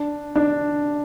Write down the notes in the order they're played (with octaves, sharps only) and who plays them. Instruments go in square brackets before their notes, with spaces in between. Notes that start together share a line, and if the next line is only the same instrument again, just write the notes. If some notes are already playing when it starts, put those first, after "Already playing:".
Already playing: [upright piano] D4
D4